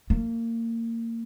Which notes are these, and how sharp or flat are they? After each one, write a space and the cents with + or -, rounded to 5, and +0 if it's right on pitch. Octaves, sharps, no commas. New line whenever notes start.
A#3 -25